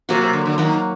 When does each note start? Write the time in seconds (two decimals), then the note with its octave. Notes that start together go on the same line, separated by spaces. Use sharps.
0.09 C3 F#3 A#3 F#4
0.21 C3
0.33 D3
0.46 D3
0.58 D#3 F#3 A#3 F#4